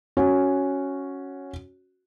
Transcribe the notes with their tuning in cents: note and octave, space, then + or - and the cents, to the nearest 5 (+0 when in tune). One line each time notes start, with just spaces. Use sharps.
C#4 +0 F#4 +0